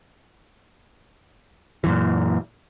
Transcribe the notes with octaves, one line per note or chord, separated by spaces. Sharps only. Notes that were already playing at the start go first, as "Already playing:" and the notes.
F#2 A#2 E3